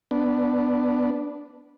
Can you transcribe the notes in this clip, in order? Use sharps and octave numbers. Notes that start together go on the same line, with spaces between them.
B3 D4